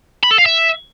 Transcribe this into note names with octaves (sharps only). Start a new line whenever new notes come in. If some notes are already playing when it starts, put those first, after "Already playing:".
B5
A4
F5
E5